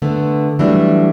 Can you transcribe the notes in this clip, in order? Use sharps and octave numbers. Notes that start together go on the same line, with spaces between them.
D3 A3 B3
E3 F#3 G3 A3 D4